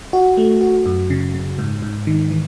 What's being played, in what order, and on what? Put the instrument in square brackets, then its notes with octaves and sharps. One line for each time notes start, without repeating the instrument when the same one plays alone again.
[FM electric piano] F#4
A3
F#4
F#2
C#3
C#3
G#2
G#2
D#3
E3